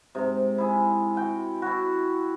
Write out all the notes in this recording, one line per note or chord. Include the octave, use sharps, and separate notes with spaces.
G#2 C3
E4 G#4
F#4 G5
E4 F#4